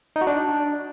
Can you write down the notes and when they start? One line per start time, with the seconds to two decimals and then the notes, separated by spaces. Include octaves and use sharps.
0.16 D#4
0.21 F#4
0.27 D4